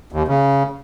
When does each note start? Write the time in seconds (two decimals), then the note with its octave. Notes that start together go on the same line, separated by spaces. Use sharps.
0.12 D#2
0.28 C#3